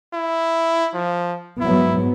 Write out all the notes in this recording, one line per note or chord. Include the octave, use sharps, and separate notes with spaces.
E4
F3
G#2 F#3 B3 E4